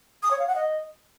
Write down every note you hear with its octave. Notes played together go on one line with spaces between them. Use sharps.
D#6
C#5
F5
F#5
D#5